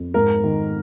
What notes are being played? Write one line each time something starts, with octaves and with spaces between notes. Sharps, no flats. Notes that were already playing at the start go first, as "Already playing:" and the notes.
Already playing: F2
G#2 A#4
D#3